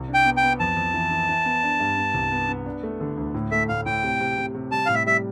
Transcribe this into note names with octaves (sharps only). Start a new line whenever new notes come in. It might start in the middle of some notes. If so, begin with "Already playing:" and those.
Already playing: C2
D4
G5
B3
G5
B3
F2 A5
F2
E3
E3
E3
B3
D4
G2
B3
C2
B3
B3
D4
A3
D3
D2
A2
A3 E5
A2 F5
A2 G5
C3
C3
C3
C3
G3 A5
A2 F5
E5
G3 E5